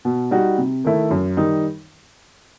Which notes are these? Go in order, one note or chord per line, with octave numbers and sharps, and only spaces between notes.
B2
G3 D#4 F#4
C3
D#3 A3 E4
F#2
D#3 G3 D#4